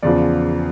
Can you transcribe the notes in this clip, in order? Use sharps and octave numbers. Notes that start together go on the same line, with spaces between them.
E2 C#3 F3 D5